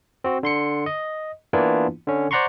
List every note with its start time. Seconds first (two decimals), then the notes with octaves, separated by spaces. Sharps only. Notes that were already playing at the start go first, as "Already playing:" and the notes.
0.24 C4 F#4
0.43 D3 C6 C#7
0.86 D#5
1.53 E3 A#3 B3 D4 E4 F4
2.07 D3 C#4
2.31 C5 D5 F#5 A#5 C6 C#6